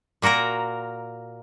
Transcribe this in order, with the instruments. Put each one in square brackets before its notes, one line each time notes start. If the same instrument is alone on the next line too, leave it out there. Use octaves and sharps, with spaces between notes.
[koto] A#2 A#3 F#4 A#4 A#5